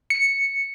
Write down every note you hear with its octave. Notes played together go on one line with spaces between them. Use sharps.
C#7